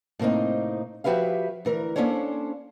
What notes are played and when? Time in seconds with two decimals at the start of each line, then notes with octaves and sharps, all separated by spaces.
0.19 A2 C3 A#3 C4 D#4
1.04 F3 F#4 G4 B4 E5 F5
1.65 D2 E3 A#4
1.96 A#3 C#4 D4 A4 C5 C#5